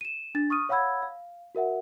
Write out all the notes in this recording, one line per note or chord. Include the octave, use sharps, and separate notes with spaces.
D#7 E7
D4 A6
C#6 D#6 F6 D#7
C#5 F5 F#5 B5 E6 G#6
F5
F#4 A#4 E5 F#5